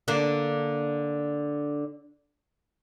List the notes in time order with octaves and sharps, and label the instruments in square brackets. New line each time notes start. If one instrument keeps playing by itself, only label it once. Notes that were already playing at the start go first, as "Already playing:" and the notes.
[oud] D3 A#3 D4